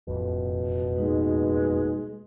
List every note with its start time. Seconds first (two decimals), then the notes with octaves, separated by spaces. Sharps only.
0.07 E1 A1 F2 B2
0.96 G#3 A#3 D#4 B4